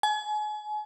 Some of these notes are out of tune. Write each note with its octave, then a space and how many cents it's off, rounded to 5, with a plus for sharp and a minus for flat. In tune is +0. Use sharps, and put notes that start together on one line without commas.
G#5 +35